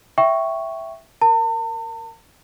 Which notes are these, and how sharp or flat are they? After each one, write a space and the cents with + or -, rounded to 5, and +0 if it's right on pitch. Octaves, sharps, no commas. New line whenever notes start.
E5 +0 G5 -10 C#6 +0
A#4 +0 A5 +45